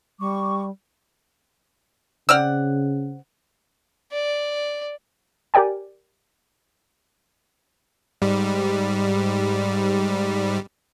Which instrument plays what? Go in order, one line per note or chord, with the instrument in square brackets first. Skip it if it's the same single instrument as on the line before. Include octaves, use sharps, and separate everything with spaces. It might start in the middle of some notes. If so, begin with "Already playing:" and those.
[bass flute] G3 [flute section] C#6 D6
[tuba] C#3 [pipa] C4 D5 F#5 [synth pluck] E6 F6
[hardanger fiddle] D5
[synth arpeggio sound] G4 A#4 D5 G5 G#5
[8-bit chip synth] G#2 G3